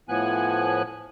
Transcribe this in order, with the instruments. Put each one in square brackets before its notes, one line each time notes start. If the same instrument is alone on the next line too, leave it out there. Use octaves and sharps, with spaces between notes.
[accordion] A2 F3 B3 G#5 F#6